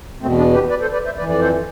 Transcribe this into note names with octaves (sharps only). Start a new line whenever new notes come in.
E2 B2 A3 C4
B3 D4
G4 B4
B4 D5
A4 C5
B4 D5
C5 E5
F2 E3 B4 D5
D5
A4 C5